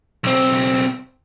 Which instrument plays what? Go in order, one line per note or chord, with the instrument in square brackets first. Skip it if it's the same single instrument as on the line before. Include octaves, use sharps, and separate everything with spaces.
[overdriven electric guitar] B1 C4